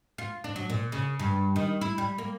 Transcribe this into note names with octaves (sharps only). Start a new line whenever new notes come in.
F4
D4
F#3
A#2
C#3
G2
D#3
E4
G3
A#3